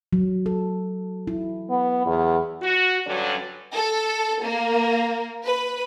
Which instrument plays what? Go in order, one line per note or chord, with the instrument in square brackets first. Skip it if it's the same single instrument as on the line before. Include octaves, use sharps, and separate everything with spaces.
[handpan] F#3
A4
E4
[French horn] B3
E2
[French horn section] F#4
G2 D3 F#3 C#4 D5
[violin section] A4
A#3
B4